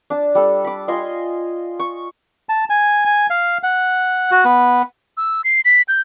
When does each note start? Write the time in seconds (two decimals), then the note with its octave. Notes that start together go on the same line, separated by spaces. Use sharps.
0.10 D4 A5
0.35 G3 A4
0.64 B5 D6
0.88 F4 D#5 G#5 C6
1.79 C#6
2.49 A5
2.70 G#5
3.05 G#5
3.30 F5
3.63 F#5
4.31 F#4
4.45 B3
5.17 E6
5.44 C7
5.65 B6
5.88 G6